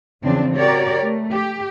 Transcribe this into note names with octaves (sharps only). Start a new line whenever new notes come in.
E2 C#3 F3 C4 D4
F#4 G4 A#4 C#5 D5
A3
G4